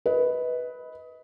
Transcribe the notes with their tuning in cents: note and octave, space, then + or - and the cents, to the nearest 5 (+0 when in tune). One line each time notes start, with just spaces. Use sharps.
B4 +0 D#5 +25